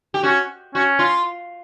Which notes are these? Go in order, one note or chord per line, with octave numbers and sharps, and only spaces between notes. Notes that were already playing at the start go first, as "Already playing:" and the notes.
G4
C#4 F#4
C#4 F#4
F4